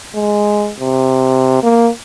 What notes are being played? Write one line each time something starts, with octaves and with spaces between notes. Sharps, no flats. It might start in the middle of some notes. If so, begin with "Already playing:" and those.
G#3
C3
A#3